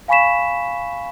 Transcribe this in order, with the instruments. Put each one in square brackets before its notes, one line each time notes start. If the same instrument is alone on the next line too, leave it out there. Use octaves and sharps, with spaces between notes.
[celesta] F5 G#5 B5 C#6 B6 E7